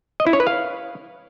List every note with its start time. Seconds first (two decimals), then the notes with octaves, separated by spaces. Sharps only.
0.20 D#5
0.27 E4
0.33 C#5
0.40 B4
0.47 F5